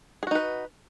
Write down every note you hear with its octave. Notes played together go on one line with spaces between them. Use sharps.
D#4 F#4 G#4 B4